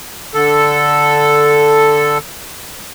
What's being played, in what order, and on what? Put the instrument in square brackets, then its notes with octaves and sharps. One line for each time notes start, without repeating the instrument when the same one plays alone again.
[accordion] D3 A4